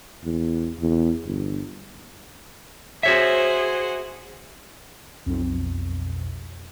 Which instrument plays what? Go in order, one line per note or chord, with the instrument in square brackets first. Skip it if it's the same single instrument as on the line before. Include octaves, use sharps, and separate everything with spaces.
[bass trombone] E2
E2
G1
[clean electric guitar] F#4 C#5 E5 [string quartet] G#4 C5 F#5
[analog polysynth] B1 F2